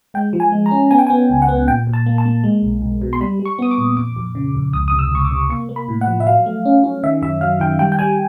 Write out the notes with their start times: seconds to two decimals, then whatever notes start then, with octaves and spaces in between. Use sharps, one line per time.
0.14 G#3 G5
0.33 F3
0.40 G#5
0.52 G#3
0.66 A#5
0.71 C#4
0.91 B3 G#5
0.98 G5
1.07 G#5
1.10 B3
1.30 C#2
1.42 F#5
1.48 B3
1.68 A#2 G5
1.87 A#2
1.93 A5
2.06 A#3
2.18 A5
2.25 A#3
2.44 G#3
2.63 B1
2.82 B1
3.01 B2
3.13 C6
3.21 G3 B5
3.39 G3
3.46 C#6
3.59 B3 D#6
3.71 D6
3.78 A#2
3.97 F2 D6
4.16 F2
4.35 C#3
4.55 F2
4.73 C#2 D#6
4.88 C3 D#6
4.99 E6
5.12 C#2 C#6
5.25 D6
5.31 C3
5.50 A#3 C#6
5.69 A#3
5.76 B5
5.88 A2
6.01 F#5
6.08 F3
6.20 E5
6.27 F#3 F5
6.46 A3
6.65 C#4
6.84 C#4
7.03 D#3 E5
7.22 F#2 E5
7.41 F#3 F5
7.60 D#3 G5
7.79 G3 G5
7.92 G5
7.99 G3 G#5